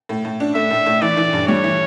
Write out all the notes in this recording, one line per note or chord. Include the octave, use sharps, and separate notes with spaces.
A2
A2
D4
A3 E5
A2
A2
E3 D5
E3
G2
G3 C#5
E3